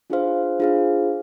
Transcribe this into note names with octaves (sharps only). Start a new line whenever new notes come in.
D4 F4 G#4 C5 F5
D4 F4 G#4 C5 F5